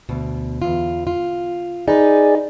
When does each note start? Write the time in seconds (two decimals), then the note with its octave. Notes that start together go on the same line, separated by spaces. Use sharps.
0.09 D2 B2
0.62 E2 F4
1.07 F4
1.88 D#4 G#4 B4 D5